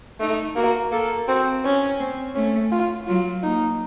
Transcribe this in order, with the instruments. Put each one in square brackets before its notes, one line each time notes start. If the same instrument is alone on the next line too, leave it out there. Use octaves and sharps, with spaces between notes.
[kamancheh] A3 [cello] D#4
[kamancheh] A#3 [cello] F#4
[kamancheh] A#3 [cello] A4
[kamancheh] C4 [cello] F#4
[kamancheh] C#4
[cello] C4
[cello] A3 [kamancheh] C#4
[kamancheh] F4
[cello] F#3 [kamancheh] F4
[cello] A#3 [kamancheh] D#4